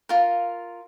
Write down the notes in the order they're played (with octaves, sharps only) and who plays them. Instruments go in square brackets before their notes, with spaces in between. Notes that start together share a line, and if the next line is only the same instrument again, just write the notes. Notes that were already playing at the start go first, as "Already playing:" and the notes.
[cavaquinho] F4 A#4